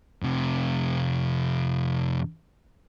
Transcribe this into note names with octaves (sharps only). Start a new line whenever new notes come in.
F2 C3